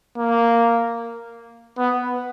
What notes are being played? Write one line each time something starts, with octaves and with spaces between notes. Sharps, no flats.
A#3
B3